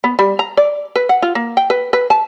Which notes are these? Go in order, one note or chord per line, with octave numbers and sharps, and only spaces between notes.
B3
G3
A#5
D5
B4
F#5
F4
A#3
G5
B4
B4
A5